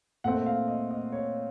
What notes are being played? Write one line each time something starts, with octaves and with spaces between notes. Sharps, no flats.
A#2 A3 C4 F#5
F5
D#5
D#5
C#5